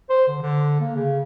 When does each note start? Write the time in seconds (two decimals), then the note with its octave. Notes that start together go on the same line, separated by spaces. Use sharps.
0.09 C5
0.28 D3
0.42 D3
0.80 A#3
0.95 C#3